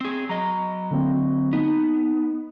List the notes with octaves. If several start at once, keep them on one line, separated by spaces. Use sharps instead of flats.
C4 G#4
F#3 D#5 A#5
D3 A#3 C4
B3 D#4